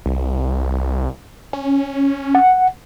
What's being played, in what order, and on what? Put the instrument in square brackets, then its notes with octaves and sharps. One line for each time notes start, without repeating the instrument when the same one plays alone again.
[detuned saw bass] C2
C#4
[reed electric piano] F#5